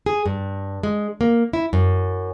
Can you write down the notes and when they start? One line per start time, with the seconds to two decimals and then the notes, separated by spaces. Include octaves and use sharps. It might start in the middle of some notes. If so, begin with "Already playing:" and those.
0.06 G#4
0.26 G2
0.83 G#3
1.21 A#3
1.53 E4
1.73 F#2